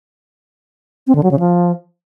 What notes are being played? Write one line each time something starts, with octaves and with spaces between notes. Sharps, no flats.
C4
D3
F#3
C#3
F3